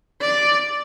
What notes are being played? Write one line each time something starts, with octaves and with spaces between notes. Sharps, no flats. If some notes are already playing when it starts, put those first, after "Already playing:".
D5